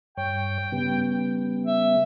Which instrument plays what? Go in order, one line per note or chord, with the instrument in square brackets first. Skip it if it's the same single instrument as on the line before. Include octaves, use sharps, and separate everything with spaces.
[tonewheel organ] G2 C#5 [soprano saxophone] G5
[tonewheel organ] C#3 G3 B3
[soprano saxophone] E5